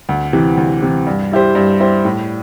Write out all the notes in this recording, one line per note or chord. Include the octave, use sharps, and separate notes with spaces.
D2
C3 E3
D2
C3 E3
G2
G3 E4 G4 C5
G2
G3 E4 G4 C5
A2